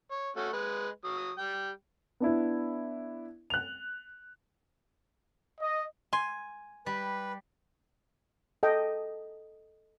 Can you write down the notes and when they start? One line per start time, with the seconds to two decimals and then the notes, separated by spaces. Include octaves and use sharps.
0.11 C#5
0.36 A3 C#4 F#4
0.53 G#3 B4
1.05 F#3 D#6
1.38 G3 G5
2.20 B3 D4 E4
3.50 F#6 F7
5.61 D#5
6.13 G#5 C6
6.86 G3 B4
8.63 A4 D#5 G5